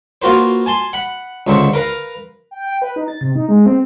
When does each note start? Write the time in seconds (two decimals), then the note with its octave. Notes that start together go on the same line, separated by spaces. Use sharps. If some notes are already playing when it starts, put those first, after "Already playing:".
0.22 A#3 F4 F#4 B4 C5
0.66 G#5 A5 C6
0.93 F#5 B5
1.47 C#2 D3 C5 E5 C#6
1.74 A#4 B4 F5 A#5
2.51 G5
2.66 G5
2.82 B4
2.96 D#4
3.08 A6
3.21 C3
3.35 D#4
3.49 G#3
3.66 C4